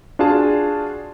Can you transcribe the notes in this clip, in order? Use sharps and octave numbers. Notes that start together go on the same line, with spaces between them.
D4 F4 F#4 G#4 A5